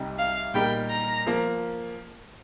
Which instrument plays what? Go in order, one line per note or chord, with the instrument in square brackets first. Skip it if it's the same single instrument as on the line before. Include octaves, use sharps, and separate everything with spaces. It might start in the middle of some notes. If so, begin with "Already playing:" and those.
Already playing: [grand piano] C2 C3 G3 D#4
[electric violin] F5
[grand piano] A#2 G3 D#4 G4 A#4 [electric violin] G5
[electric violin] A#5
[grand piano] F3 A#3